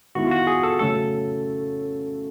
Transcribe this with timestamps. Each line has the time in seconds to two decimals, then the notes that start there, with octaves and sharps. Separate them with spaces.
0.15 D#3 G#3 B3 E4 F#4
0.27 F4
0.31 F#4
0.47 G#4
0.63 A4
0.79 C#3 F#3 A3 C#4 A4